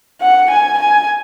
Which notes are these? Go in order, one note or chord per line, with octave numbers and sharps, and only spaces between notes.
F#5
G#5
G#5